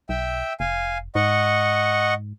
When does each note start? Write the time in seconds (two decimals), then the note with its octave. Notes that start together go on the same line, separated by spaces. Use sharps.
0.09 B1 E5 G5 E6
0.60 F1 F5 G#5
1.15 G#2 D#5 F#5 C#6